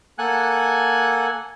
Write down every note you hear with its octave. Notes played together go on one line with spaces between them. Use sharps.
A#3 A4 F#5 G#5 F#6